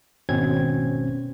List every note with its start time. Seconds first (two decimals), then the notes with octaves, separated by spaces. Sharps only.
0.29 G#1 B2 C4 C#4 G#6